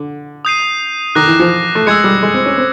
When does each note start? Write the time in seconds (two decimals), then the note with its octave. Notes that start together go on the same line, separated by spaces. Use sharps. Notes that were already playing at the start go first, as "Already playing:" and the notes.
Already playing: D3
0.45 D#6 G6 C7 D#7
1.15 D#3 D6 F#6 A#6
1.27 E3
1.39 F3
1.75 A3
1.87 G#3 E6 G#6 C#7
2.04 G3
2.23 G#3
2.34 C4
2.46 C#4
2.58 C4